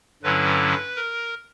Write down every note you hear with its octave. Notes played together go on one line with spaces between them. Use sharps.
G2 D3 F#3 C#4 E4 B4
A#4